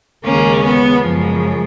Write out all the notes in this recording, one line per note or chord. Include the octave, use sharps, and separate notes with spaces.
D#2 C#3 G#3 A#3 C#4
B3
F#2 C#3 F3 G#3